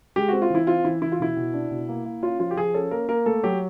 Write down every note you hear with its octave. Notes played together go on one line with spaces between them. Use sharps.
G#3 G4
C4 F#4
F4
E3 E4
C4 F4
E3 E4
E3 E4
F4
B2 E4
B2
D4
B2
A#3
A#3
C#4 F4
F3 F4
G4
F3 G#4
C#4 A4
A#3 A#4
A#3 A#4
A3 A4
F#3 G4